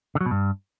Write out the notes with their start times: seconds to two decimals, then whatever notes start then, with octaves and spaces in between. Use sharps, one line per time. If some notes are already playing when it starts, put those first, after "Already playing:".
0.15 D3
0.21 F#3
0.26 B2
0.31 G2